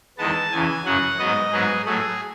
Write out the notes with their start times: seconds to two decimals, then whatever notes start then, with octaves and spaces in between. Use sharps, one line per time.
0.18 E2 D#3 G#3 B3 A5
0.52 E2 C#3 E3 G#5
0.85 F#2 C#3 F#3 F#5
1.19 G#2 F#3 B3 D#5
1.52 G#2 F#3 B3 G#4
1.85 A2 F#3 A3 G#4